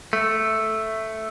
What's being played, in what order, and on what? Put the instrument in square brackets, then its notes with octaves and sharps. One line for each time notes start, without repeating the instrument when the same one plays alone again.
[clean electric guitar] A3